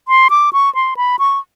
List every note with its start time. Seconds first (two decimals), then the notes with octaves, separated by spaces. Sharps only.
0.08 C6
0.30 D6
0.53 C#6
0.75 C6
0.97 B5
1.19 C#6